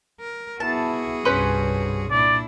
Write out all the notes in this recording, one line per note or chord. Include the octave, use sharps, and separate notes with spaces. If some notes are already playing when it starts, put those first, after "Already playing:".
A#4
B3 E4 F#4 G#4 A5
C2 G2 C#4 B4 C5
A#2 D4 E4 D5